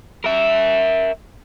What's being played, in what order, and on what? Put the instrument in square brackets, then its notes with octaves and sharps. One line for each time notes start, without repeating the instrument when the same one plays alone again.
[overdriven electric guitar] A#4 E5